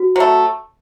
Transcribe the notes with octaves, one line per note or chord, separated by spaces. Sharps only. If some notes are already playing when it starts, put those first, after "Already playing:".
Already playing: F#4
F#3 A3